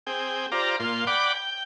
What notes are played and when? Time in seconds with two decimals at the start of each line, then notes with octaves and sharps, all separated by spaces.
0.07 C4 G#4 G5
0.52 F4 G4 C5 D5 A#5
0.80 A#2 F4 C6
1.07 D5 F#5 G5 B5 D6
1.34 G5